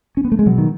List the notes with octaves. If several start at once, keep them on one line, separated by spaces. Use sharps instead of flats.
C#4
B3
A3
G#3
B2 F#3
D#3